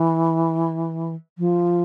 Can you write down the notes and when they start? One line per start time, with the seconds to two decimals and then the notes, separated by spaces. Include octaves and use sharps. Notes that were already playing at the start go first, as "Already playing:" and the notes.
Already playing: E3
1.38 F3